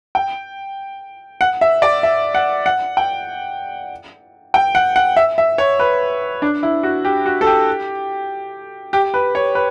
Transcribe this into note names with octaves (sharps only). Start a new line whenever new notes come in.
G5
F#5
E5
D5
E5
F#5
F#5
G5
G5
F#5
F#5
E5
E5
C#5
B4
D4
E4
F#4
G4
F#4
A4
G4
G4
B4
C#5
B4